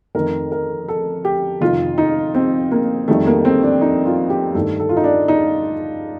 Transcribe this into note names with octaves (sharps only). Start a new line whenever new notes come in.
F2 D#3 A3 A#4
A#4
A4
G4
F2 C3 D#3 F4
D#4
C4
A#3
F2 D#3 G3 A3
A#3
C4
D4
D#4
F4
G4
G2 D#3 A3 A4
A4
F4
D#4
D4
D#4